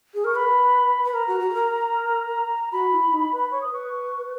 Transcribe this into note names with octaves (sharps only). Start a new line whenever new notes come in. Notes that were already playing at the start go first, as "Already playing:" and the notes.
G#4
A#4 C#6
B4 B5
B4 B5
A#4 A#5
F#4
F#4
G#4
A#4
F#4 B5
E4
D#4
B4
C#5 C#6
D#6
B4 C#6